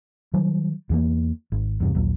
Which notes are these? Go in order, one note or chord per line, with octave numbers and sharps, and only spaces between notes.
D#3 F#3 G3
E2 E3 A#3
G#1
E2 G2 C3
A#1 D#2 F#3